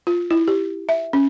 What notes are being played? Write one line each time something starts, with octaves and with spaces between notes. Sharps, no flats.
F4
E4
G4
E5
C#4